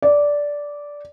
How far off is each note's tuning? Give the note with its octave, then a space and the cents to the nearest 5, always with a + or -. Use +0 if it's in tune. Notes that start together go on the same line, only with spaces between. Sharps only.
D5 -10